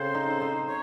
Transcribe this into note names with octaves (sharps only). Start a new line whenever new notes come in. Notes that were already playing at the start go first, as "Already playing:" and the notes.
Already playing: C#3 C4 A4 C5
D#4
D#4
C#5